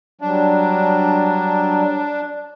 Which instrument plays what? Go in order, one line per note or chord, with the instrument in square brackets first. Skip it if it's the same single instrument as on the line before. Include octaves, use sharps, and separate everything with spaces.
[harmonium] F#3 G3 [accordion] D4